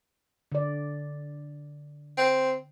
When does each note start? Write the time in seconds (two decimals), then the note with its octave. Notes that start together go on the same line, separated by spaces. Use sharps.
0.52 D3 D5
2.17 C4